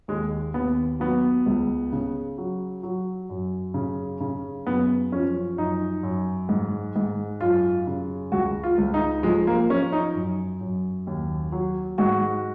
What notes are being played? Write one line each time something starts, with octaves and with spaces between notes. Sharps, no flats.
D#2 G#3
D#2 B3
F#3 B3
C#2
C#3
F#3
F#3
F#2
C#3
C#3
F#2 B3
F3 C#4
F#2 D#4
F#2
G#2
G#2
F#2 F4
C#3
C#2 F#4
F4
C#2
D#4
F3 G#3
A#3
F3 C#4
D#4
F#2
F#2
D#2
F#3
G#2 F#4